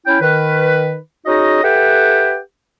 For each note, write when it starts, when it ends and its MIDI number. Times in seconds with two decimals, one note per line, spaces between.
0.06 0.20 61
0.06 0.20 64
0.06 0.20 79
0.20 0.96 51
0.20 0.96 71
1.26 1.61 61
1.26 1.61 63
1.26 1.61 66
1.26 1.61 68
1.26 1.61 75
1.63 2.37 67
1.63 2.37 69
1.63 2.37 71
1.63 2.37 76
1.63 2.37 78
1.63 2.37 79